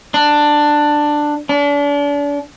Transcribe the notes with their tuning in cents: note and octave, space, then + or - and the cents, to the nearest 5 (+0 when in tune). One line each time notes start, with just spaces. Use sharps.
D4 +10
D4 -35